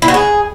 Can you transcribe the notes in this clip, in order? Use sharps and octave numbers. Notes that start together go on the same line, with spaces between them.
E4
F#4
G#4